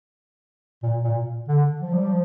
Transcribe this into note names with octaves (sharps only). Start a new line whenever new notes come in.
A#2
A#2
D3
F3
G3
F3